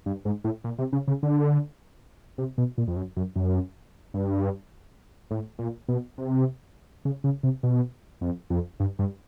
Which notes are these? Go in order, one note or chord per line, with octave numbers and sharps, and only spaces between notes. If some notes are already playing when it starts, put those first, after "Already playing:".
G2
G#2
A2
A#2
C3
C#3
C#3
D3
C3
B2
A#2
F2
F#2
F#2
F#2
G2
A2
A#2
B2
C3
C#3
C#3
C3
B2
F2
F2
G2
G2